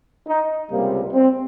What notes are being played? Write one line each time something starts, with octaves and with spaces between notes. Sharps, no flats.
D#4
C#2 C3 G3 A#3
C4